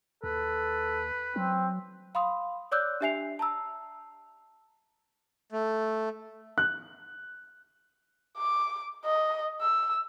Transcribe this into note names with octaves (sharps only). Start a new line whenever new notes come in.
D#2 A4 B4
F#3 C4
F5 B5 C6 D#6
C#5 D5 D6 E6 F#6 G6
D4 G4 E5 G#5 C7 F7
A5 A#5 E6
A3
F#6
D6
D#5
E6